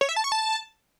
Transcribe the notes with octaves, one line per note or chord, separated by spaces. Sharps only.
C#5
E5
A5
C#6
A5